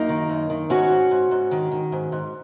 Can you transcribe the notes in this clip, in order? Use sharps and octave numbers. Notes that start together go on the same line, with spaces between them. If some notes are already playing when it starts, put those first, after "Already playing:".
Already playing: F#2 A#3 D#4
D#3
F#2
D#3
G#2 C#4 F#4
G#2
G#2
G#2
D#3
D#3
G#2
G#2